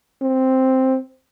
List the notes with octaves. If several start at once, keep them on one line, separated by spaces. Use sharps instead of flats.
C4